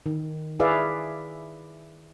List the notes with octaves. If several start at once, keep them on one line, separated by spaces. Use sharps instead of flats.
D#3
E4 G#4 B4 D5 E5 F5